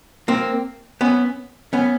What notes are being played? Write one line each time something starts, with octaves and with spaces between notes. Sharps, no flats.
A#3 C4
B3 C#4
B3 C#4